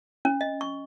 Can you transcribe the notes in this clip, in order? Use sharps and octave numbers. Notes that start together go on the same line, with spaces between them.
C#4
D#5
C#6